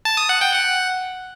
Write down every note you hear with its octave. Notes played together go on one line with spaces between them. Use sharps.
A5
D#6
F#5
G5
F#5